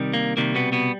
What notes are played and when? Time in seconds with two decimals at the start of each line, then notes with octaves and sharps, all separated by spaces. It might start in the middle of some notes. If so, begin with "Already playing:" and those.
Already playing: C3 D#3 G3
0.14 A#3
0.37 C3 D#3 G3 A#3
0.55 B2 B3
0.72 B2 B3